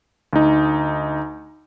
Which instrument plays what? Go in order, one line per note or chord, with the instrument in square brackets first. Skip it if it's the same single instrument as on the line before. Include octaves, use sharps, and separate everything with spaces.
[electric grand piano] D2 D#4